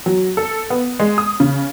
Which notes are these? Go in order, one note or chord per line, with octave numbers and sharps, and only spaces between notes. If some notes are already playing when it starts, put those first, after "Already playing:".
F#3
A4
B3
G#3
D#6
C#3